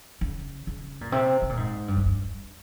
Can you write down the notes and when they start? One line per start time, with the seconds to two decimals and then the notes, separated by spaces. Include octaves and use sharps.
0.21 C#3
0.67 C#3
1.01 A#2
1.12 C3
1.42 C3
1.49 A#2
1.57 G#2
1.88 G2
1.97 F2
2.06 G2